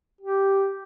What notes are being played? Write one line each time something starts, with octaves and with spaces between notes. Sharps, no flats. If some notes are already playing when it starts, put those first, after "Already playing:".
G4